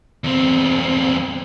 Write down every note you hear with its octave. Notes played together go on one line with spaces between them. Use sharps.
E2 C4